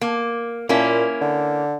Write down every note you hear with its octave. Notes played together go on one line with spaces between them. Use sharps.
A#3
A#2 A#3 C#4 E4
D3